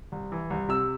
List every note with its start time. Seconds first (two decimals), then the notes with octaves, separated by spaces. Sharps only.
0.12 C2
0.32 E3
0.50 C2
0.68 C3 E6